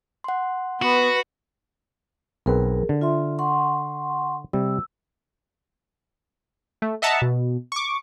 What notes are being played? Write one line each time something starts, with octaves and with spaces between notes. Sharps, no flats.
F#5 C6
B3 F#4 B4
B1 C4 G#4 A#4 B4
D3
F4 E5 C6
F#5 C6 C#6
C3 G3 E6
A3
D#5 E5 F#5 A5 A#5
B2
C#6 D6